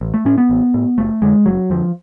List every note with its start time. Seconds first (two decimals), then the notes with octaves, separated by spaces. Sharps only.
0.01 A1
0.14 A3
0.25 A2 C#4
0.38 B3
0.50 A1
0.74 A2
0.98 F#1 A3
1.22 F2 D3 G#3
1.46 F#1 F#3
1.70 F2 D3 F3